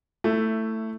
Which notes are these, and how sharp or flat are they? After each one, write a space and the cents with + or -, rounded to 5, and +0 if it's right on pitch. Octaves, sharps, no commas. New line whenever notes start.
A3 +15 E4 +5